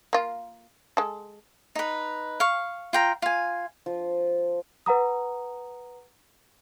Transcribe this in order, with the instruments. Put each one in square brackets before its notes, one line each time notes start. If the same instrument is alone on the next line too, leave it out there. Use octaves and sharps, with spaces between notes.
[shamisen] A#3 F4
G#3 A4
[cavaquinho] D#4 B4
F5 C#6
F4 G5 A#5
F4 G#5
[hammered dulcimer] F3
[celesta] B4 F#5 A#5 D#6